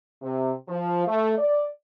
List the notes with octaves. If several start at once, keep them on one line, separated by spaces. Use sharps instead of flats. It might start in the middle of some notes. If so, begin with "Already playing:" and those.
C3
F3
A3
D5